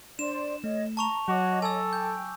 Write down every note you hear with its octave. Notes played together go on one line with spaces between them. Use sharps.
D4 C5 D5 C6 E7
A3 C#5 D#5
A5 A#5 C#6 F7
F#3 F#4 C#5 D#5 D6
A4 G#5 E6
G5 G6